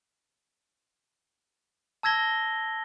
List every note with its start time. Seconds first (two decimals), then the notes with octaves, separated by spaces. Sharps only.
2.03 A5 E6 G#6 A#6 G7